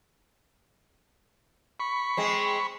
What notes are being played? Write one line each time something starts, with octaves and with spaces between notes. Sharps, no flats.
B5 C#6
G#3 C4